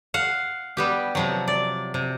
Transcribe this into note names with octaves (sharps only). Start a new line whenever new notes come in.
F5 F#5
G3 B3 G4
C3 F3 F#3
D5
C3